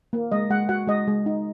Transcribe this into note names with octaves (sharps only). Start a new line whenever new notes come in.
A#3
G#3 D#5
G#3 F#5
F#4 F#5
G#3 D#5
G#3
D#4